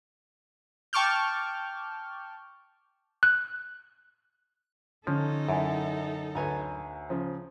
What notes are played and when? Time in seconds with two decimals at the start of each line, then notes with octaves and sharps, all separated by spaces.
0.93 G5 A5 C#6 D6 F6 G6
3.23 F#6
5.07 D3 F3 C#4 D#4 A4
5.49 F#2 E4 G#5
6.35 D2 B4 C#5 G#5 A#5
7.10 C#3 F3